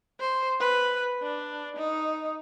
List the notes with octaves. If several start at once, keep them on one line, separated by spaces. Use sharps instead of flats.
C5
B4
D4
D#4